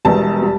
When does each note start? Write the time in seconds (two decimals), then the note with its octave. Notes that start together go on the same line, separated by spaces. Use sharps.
0.05 E1 E2 B2 G3 A5
0.42 G3